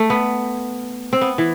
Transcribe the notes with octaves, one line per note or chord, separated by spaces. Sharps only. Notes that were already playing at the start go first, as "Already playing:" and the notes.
Already playing: A3
B3
C4
B3
E3